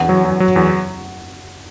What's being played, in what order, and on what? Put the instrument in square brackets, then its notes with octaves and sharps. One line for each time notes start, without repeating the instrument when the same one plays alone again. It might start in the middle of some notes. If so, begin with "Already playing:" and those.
Already playing: [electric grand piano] E2 [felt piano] F#5
[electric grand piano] F#3
F#3
F#3
E2